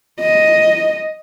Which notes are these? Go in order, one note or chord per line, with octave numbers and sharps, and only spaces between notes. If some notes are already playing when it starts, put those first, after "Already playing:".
D#5